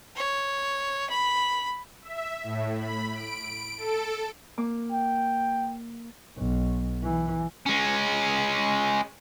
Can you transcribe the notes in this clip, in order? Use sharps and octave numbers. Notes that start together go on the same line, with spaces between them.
C#5
B5
E5
A2
B5
D7
A4
A#3 D6
G5
B1
E3
G#3 C#4